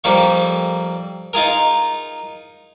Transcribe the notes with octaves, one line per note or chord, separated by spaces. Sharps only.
F2 G3 A#3 C#6
D#4 F4 G#4 A#4